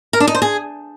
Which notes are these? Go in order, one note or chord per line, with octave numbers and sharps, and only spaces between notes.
A#4
D4
D#4
C5
G#4